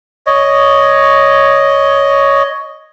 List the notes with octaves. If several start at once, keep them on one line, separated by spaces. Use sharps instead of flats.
C#5 D#5